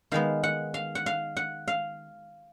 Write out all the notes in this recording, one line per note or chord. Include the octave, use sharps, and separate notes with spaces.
D#3 G#3 B3 F5
F#5
F5
F#5
F5
F#5
F5